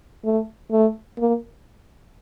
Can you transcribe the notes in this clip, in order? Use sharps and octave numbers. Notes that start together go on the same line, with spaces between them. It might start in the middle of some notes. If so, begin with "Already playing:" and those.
A3
A3
A#3